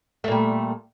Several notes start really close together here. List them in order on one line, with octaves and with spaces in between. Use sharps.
A3 A#2 G3